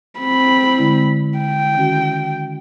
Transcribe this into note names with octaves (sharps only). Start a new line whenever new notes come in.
C4 B5
D3 G#3 E4
G5
D#3 C#4 F#4